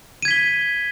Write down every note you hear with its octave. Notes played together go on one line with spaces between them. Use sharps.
G#6 B6 D#7 G7